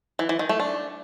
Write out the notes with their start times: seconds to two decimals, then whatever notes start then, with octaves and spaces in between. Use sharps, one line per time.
0.19 E3
0.29 E3
0.39 D#3
0.49 A3
0.60 D4